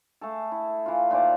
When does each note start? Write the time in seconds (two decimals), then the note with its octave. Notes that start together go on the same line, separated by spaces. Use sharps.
0.21 A3 G#4 A4
0.52 E4
0.86 E3 F4
1.11 A#2 D#3 C5 D5